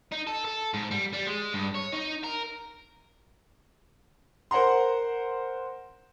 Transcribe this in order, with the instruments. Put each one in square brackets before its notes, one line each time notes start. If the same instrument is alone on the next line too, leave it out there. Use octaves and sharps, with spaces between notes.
[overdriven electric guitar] D#4
A4
A4
G#2
G3
G3
G#3
G2
C#5
D#4
A#4
[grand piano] A#4 C5 F#5 A#5 C6